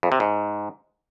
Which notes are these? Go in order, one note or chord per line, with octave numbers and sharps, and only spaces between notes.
F2
C3
G#2